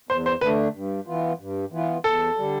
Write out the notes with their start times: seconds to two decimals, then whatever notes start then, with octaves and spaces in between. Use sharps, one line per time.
0.09 E2 C5
0.26 C5
0.41 D3 A3 D4 B4
0.74 G2
1.07 E3 B3 F4
1.39 G2
1.72 E3 B3 F4
2.04 E2 A4
2.37 D3 G3